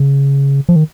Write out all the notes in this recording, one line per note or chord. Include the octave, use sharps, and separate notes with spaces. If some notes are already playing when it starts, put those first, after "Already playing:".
Already playing: C#3
F3
D#3